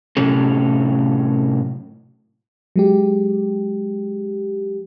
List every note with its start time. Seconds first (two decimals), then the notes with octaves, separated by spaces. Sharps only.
0.17 A2 C3 F#3 C#4 A4
2.76 F#3 G#3 G4